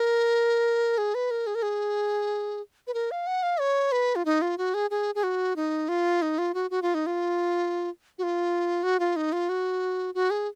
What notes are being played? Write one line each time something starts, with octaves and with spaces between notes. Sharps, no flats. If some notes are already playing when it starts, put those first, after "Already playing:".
Already playing: A#4
G#4
B4
A#4
G#4
A#4
G#4
B4
A#4
F5
F#5
F5
C#5
B4
F4
D#4
F4
F#4
G#4
G#4
G#4
F#4
D#4
F4
D#4
F4
F#4
F#4
F4
D#4
F4
F#4
F4
F#4
F4
D#4
F4
F#4
F#4
G#4